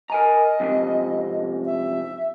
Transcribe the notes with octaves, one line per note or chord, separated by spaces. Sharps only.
A#4 D#5 G#5 A#5
F2 G#2 C3
E5